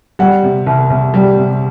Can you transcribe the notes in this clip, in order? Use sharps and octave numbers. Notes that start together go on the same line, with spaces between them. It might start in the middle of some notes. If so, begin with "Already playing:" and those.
G3 F#5
C3
C2
C2
G3
C3